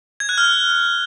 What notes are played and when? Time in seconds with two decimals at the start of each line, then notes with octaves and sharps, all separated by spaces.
0.20 G#6
0.29 F#6
0.38 F6